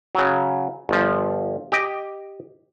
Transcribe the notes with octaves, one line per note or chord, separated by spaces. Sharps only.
C#3 F#3
G1 F3
G4 D#5 G5